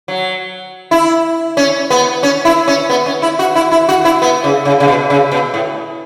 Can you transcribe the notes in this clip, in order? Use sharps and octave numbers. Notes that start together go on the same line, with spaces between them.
F#3
E4
C#4
B3
C#4
E4
C#4
B3
C#4
E4
F#4
E4
E4
F#4
E4
B3
C#3
C#3
C#3
B2
C#3
B2
A2